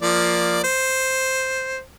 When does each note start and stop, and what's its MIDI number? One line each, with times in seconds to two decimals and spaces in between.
0.02 0.61 53
0.02 0.61 58
0.02 0.61 74
0.64 1.80 72